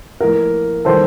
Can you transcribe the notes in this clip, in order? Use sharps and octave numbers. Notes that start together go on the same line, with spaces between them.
A2 F3 A#3 A#4
D#3 G3 A#3 A4 C5